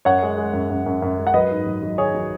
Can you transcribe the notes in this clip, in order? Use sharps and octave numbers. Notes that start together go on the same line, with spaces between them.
F#2 C#5 F#5
G#3
G#3
F#2
F#2
F#2
F#2
G#3
F#5
F#3 B4 D#5
G#2
F#3
F#3
D#3 G#4 C#5
F#3